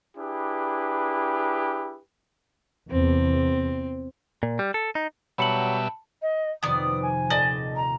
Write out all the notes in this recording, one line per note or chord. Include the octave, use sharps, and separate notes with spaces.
D4 E4 G4 G#4 B4
E2 C3 C4
A#2
G3
A4
D#4
B2 F#3 G3 E5 A5 B5 C#7 F#7
D#5
F2 C3 D#3 B3 D5 D#6
G#5
D#1 D5 D#5 A5
A#5